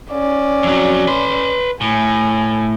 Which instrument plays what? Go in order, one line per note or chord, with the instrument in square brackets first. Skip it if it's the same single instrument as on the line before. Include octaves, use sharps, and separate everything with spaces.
[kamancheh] C#4 D5
[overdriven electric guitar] F2 F#3
B4 C6
[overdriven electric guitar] A2 [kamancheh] G#5